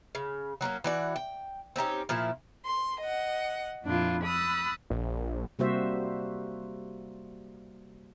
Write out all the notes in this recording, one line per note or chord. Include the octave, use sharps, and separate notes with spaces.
C#3
F#3 A#3 C4 C#4
E3 F#4 D5
G5
C4 C#4 D#4 G4
A#2 F3 E4
C6
D#5 F#5
F2 A#2 D4 E4 F4
B5 D#6 E6 F#6 A6
A#1
C3 G3 A#3 F#4 C5 E5